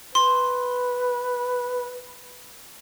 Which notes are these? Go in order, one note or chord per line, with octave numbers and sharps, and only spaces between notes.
B4 C6